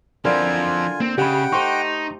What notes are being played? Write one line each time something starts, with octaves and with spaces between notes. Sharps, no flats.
D3 F3 C4 E4 F4 A#4 G#5
A#3 C4
C#3 G4 D#5 F#5 G5 B5
A3 D#4 G4 C5 C6 C#6